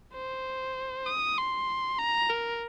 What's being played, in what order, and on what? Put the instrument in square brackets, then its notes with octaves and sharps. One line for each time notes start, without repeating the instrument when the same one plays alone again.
[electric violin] C5
D#6
C6
A#5
A#4